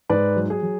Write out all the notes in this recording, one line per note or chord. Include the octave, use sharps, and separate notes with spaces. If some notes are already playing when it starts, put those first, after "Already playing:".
G#2 B4 D5
F#3
G#4
F#3